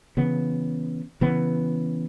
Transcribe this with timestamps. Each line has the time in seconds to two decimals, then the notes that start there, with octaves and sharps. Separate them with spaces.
0.17 C#3 E3 B3
1.21 C#3 E3 B3